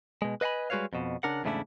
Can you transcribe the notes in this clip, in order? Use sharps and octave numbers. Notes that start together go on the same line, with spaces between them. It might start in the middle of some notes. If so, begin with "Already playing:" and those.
B2 G#3
B4 D#5 F5 G#5 B5
G3 G#3 F#4 B4 C#5 F5
F2 B2
C#3 D4 A#4 F#5
E2 G#2 C#3 A3 D4 E4